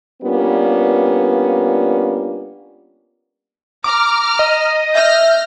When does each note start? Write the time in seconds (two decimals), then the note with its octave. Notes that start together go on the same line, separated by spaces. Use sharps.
0.23 G3 A#3 B3 C#4 D4 F4
3.84 A#5 D6 F6
4.39 D#5
4.95 E5 F6 G6 A#6